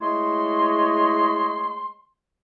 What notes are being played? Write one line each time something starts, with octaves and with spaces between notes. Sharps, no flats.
G#3 A3 E4 C#5 D#5 C6